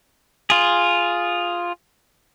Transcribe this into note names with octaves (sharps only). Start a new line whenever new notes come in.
F4 G#4